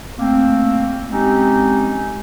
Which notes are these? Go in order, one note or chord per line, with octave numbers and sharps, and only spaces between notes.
A3 A#3 C4
G#3 C4 C#4 D#4 G4